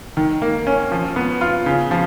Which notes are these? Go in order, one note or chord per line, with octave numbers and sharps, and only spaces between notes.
D#3
A#3
C#4
F3
B3
F4
C#3
F3